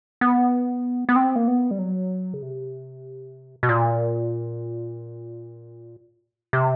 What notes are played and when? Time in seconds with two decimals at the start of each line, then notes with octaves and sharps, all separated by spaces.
0.21 B3
1.09 B3
1.16 C4
1.36 A#3
1.48 B3
1.71 G3
1.79 F#3
2.34 C#3
2.42 C3
3.63 B2
3.69 A#2
6.53 C3